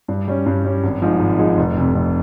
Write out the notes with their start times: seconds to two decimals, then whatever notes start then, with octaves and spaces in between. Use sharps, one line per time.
0.08 G2
0.28 G3 C#4
0.46 G2
0.64 G3 C#4
0.84 G#1
1.02 G#2 F3 G#3 D#4
1.20 G#1
1.39 G#2 F3 G#3 D#4
1.57 F1
1.77 F2 C3
1.95 F1